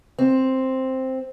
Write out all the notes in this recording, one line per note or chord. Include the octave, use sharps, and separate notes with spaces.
C4